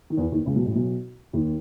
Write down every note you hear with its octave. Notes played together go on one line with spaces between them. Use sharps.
D#3
E2 E3
D#2 D#3
C#2 C#3
B1 B2
A1 A2
B1 B2
D#2 D#3